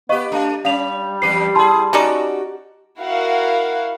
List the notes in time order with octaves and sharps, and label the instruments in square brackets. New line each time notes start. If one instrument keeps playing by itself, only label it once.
[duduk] B3 [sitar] G4 B4 [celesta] D#5 F5 C#6
[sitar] A3 [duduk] D4
[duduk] G3 [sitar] C#4 [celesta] F5 F7
[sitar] E2 G4 B4 [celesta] C7
[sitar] E4 G#4 [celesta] A5 C6
[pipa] C#4 D#4 D5 [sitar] F#4 G4
[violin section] E4 F#4 A#4 F5 F#5